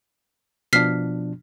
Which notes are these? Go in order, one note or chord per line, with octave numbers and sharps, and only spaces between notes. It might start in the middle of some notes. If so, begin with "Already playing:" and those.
B2 F3 D4 F6 B6 C7